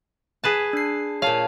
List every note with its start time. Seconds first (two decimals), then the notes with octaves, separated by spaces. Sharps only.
0.44 G#4 B4 A5
0.73 D4 C7
1.22 A#2 C#5 F5 A5